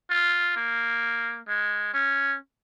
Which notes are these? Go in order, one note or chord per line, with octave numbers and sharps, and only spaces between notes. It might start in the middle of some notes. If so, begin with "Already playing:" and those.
F4
A#3
G#3
C#4